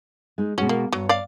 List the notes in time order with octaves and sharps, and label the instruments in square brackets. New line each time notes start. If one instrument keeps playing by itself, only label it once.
[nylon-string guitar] G#3 D#4
[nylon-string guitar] B2 G#3 F#4 [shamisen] C#4
[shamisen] A#3
[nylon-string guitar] G2 C#5 [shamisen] F#3
[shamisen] D5 F5